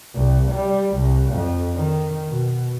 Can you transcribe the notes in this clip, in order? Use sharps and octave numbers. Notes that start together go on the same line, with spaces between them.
C2
G3
C2
F2
D#3
B2